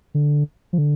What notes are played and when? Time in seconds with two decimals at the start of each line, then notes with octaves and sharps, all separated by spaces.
0.14 D3
0.73 F3
0.78 D3